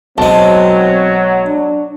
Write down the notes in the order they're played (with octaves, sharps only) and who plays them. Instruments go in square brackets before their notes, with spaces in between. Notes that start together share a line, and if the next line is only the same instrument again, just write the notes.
[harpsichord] B1 G#3 [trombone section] F#3 [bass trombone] C4 [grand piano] A5
[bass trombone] D4